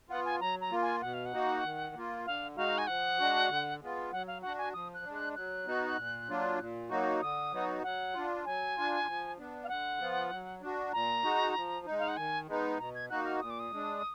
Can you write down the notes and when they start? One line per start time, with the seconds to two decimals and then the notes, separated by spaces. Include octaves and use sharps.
0.09 B3 F4 F#5
0.25 G#5
0.40 F#3 A#5
0.61 A#5
0.71 A#3 F4
0.82 G#5
1.01 B2 F#5
1.14 F5
1.26 F#5
1.33 A#3 D#4 F#4
1.64 D#3
1.95 A#3 F4
2.26 D3 F5
2.56 G#3 D#4 F#4 F5
2.78 G#5
2.87 F3 F#5
3.19 G#3 D4 F#4
3.49 D3
3.81 G#3 B3 F4
4.12 F#3 F#5
4.27 F5
4.42 D4 F#4 F#5
4.58 G#5
4.73 F3 D#6
4.94 F#6
5.04 G#3 D4
5.14 F#6
5.35 F#3 F#6
5.66 B3 D#4 F#4
5.97 A#2
6.28 F#3 A#3 D4 F4
6.59 A#2
6.90 F#3 A#3 D#4 F#4
7.21 D3 D#6
7.52 F#3 B3 D#4 F#4
7.83 F#3 F#5
8.14 D4 F4
8.45 F#3 G#5
8.76 D4 F4
9.07 F3
9.38 B3 D4
9.64 F5
9.68 D3 F#5
10.00 F3 B3 F4
10.31 F#3
10.62 D4 F#4
10.92 A#2 A#5
11.23 G#3 D#4 F#4
11.55 F3
11.86 G#3 D#4
11.99 F5
12.08 F#5
12.16 D#3 G#5
12.48 G#3 B3 D#4
12.78 B2 A#5
12.95 G#6
13.10 A#3 D#4 F#4 F#6
13.25 F6
13.40 A#2 D#6
13.50 D6
13.59 D#6
13.71 G#3 D4